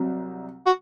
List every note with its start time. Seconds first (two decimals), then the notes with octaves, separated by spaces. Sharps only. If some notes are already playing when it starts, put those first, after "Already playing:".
Already playing: C2 C3 F#3
0.66 F#4